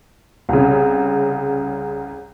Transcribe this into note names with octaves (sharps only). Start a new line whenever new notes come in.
C2 C#3